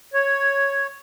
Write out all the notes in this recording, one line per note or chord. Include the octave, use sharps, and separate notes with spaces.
C#5